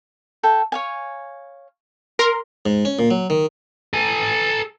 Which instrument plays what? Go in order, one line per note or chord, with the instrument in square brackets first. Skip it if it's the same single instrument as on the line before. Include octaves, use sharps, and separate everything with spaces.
[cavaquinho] A4 E5 G5
C#5 F5 G#5
[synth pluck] A#4 [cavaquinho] C6
[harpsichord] G#2
C#4
A#2
F#3
D#3
[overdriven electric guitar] A4 G#5